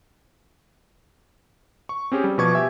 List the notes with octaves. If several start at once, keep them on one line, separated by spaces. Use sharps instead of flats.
C#6
C4 C#4 G4 G#4
G3
B2 F3 B4 C#6 D6 G#6
G4 E5 G#5